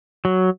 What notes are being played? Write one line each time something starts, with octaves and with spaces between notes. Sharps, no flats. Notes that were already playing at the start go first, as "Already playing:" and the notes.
F#3